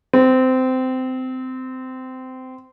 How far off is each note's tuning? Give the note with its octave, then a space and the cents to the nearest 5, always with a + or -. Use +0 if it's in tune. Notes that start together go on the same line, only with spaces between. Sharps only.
C4 -20